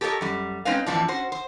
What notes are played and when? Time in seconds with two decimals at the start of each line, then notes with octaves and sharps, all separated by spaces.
0.01 G4 A4 A#4 C5 C#5 D#5
0.21 F#2 G3
0.65 G#3 C4 C#4 D#4 B4 F5
0.86 F2 A2 E3 F3 D4
1.08 C#4 F#4 C5
1.32 C5